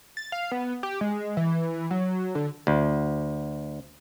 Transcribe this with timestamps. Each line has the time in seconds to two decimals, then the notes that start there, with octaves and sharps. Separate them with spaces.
0.17 A6
0.32 F5
0.52 B3
0.83 G4
1.01 G#3
1.37 E3
1.91 F#3
2.35 D3
2.67 D2